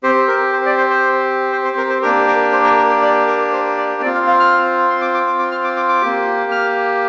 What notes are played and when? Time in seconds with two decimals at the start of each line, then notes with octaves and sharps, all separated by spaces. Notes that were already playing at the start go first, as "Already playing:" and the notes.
0.03 C4 G4 C5
0.28 A#4
0.53 C5
0.66 D5
0.77 C5
0.90 C5
1.52 C5
1.65 C5
1.77 A#4
1.89 C5
2.02 A#3 D4 G4 A#4
2.27 A#4
2.52 C5
2.64 A#4
2.77 A#4
2.90 G5
3.02 D5
3.27 A#4
3.52 C5
3.77 D5
4.02 C4 F4 D5
4.14 F5
4.27 F5
4.40 F6
4.90 C6
5.01 D6
5.14 D6
5.27 D6
5.39 D6
5.52 F6
5.64 D6
5.76 D6
5.89 D6
6.02 A#3 G4
6.51 F6